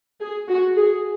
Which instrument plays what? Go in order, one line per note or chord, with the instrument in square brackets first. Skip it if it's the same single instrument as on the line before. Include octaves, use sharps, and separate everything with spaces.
[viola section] G#4
F#4
G#4